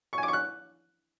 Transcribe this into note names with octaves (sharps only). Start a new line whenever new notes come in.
C#6
G#5
D6
C#6
F#6